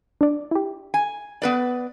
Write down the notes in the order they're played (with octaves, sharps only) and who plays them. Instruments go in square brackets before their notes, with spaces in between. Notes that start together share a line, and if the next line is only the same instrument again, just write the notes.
[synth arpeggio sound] D4 D5
E4 G4
[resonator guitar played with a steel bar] G#5
B3 B4 D5